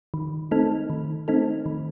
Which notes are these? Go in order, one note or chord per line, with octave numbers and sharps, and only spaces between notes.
D#3
A3 C4 D#4 A4
D#3
A3 C4 D#4 A4
D#3